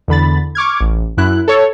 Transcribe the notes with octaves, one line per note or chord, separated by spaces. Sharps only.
E2 D3 B5 A6
C#6 D6 F6 G#6
A1
F#2 E4 F#6
A4 C#5